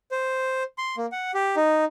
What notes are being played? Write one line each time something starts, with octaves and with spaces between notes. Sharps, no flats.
C5
C6
A#3
F#5
G4
D#4